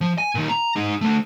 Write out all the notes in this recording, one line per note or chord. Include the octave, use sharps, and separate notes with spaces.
F3
G#5
A#2 D#3
A#5
D#4 G#4
D3 A3